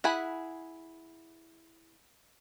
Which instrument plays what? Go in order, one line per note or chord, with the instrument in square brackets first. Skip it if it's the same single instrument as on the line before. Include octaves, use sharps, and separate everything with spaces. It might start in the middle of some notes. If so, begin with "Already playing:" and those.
[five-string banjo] E4 G#4 F#5 G#5 B5